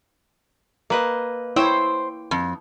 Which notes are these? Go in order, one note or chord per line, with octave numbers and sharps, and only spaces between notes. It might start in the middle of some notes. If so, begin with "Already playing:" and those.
A#3 B4 D#5
E4 C5 C#5 G5 E6
F2